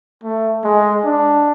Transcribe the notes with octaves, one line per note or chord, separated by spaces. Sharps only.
A3
G#3
D4